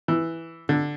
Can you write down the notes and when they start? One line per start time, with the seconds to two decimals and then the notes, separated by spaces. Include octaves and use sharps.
0.08 E3
0.69 D3